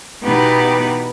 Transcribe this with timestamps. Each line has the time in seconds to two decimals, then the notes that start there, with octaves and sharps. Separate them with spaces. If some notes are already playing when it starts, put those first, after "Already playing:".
0.23 B2 E3 B3 D#4 G4 B4